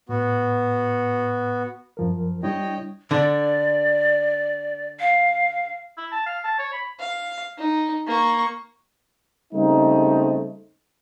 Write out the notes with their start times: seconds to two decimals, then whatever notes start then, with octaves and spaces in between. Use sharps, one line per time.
0.09 A2 B3 F#4
1.97 F#2 F3 A#4
2.43 G3 D4 E4 C#5 D#5 G5
3.11 D3 D5
5.00 F5
5.97 E4
6.12 A5
6.26 F5
6.44 A5
6.59 C#5
6.73 B5
7.00 F5
7.58 D#4
8.07 A#3 C#6
9.53 C#3 G3 A3 A#3 C4 D#4